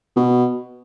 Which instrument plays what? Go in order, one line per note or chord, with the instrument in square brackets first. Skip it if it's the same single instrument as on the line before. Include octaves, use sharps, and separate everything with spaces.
[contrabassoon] B2